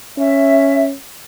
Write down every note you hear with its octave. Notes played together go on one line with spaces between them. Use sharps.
C#4 E5